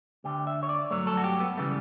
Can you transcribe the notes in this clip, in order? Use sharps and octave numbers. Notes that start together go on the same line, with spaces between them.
D2 D3 A3 G4
E5
C#5
D5
G2 F#3 A3 C#5
A4
F#4
G4
B3
C#3 E3 G3 A3